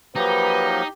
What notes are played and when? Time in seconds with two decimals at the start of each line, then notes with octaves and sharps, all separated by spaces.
0.16 F3 F#3 A#3 D#4 G4 B4